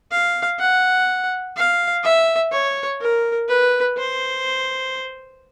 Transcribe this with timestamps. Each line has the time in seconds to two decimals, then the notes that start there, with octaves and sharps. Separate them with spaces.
0.11 F5
0.59 F#5
1.57 F5
2.04 E5
2.52 C#5
3.01 A#4
3.49 B4
3.97 C5